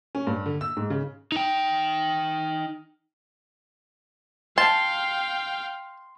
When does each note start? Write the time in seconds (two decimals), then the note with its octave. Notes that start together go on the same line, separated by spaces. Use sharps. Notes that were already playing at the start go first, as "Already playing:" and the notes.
0.15 C#4
0.27 G2
0.46 D3
0.61 E6
0.77 G#2
0.90 C#3
1.32 D#4 G5
4.58 F5 G5 A5 C6